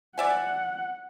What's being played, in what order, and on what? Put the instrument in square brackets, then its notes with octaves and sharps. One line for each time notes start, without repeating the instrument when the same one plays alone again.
[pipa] D5 E5 G#5 [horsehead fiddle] F#5